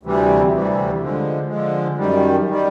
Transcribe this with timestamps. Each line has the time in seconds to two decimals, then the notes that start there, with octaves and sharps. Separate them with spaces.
0.03 D2 C3 E3 G3
0.52 D2 C3 E3 G3
1.00 D3 F3 G#3
1.49 D3 F3 G#3
1.98 F#2 D#3 G3
2.48 D#3 G3